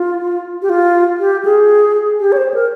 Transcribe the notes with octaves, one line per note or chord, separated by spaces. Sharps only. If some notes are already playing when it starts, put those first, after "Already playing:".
Already playing: F4
G4
F4
G4
G#4
G4
C#5
C5
A#4